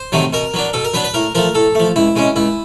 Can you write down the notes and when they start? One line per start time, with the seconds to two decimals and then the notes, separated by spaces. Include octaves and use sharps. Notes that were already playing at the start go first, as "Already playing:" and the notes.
Already playing: C5
0.12 C3 D#3 F#3 A3
0.33 B2 A#4
0.54 F#3 B3 D4
0.73 B2 A4
0.84 A#4
0.94 F#3 B3 D4 B4
1.04 B4
1.14 A2 A#4
1.35 F3 A3 A#4
1.55 A2 A4
1.75 F3 A3
1.96 C#2 E4
2.16 B2 G#3 C#4
2.36 C#2 E4